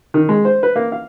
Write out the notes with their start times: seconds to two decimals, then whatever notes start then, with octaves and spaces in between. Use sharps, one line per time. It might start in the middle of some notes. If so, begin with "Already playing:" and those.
0.14 D#3
0.29 G#3
0.45 C5
0.63 B4
0.76 A#3
0.92 F5